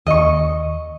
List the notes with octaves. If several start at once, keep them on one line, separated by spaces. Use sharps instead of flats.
D#2 D#5 C#6